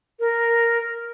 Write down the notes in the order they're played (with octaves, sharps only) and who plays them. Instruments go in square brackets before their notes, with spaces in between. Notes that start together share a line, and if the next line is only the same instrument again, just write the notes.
[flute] A#4